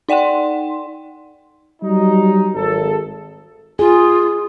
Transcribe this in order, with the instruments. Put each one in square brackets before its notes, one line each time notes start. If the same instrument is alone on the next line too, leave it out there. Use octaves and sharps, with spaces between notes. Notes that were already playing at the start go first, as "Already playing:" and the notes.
[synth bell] D#4 D5 F#5 G5 C6
[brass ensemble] F#3 G3 D#4
G#1 A4
[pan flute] F4 [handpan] G#4